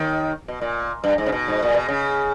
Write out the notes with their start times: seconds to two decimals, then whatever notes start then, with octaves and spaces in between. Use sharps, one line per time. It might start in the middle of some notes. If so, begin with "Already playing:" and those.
Already playing: D#2 D#3
0.48 B2
0.61 A#2
1.04 G2
1.18 G#2
1.26 C#3
1.32 B2
1.48 G#2
1.63 A#2
1.75 B2
1.89 C#3